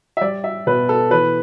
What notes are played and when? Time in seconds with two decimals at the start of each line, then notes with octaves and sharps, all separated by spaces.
0.17 E5
0.21 G3 D5
0.44 E5
0.67 B2 B4
0.89 A4
1.11 E3 B4